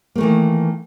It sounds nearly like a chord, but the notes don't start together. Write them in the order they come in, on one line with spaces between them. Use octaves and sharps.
A#3 A3 E3 D#3